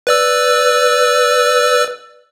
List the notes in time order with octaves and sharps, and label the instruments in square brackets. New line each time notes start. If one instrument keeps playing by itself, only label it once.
[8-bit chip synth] B4 D5 E6